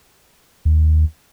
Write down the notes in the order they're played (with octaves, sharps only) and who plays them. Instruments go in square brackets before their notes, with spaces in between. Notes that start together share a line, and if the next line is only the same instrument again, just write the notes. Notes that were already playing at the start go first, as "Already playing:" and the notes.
[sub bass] D#2